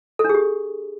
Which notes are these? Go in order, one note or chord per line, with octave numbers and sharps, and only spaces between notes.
A4
D4
G#4
G4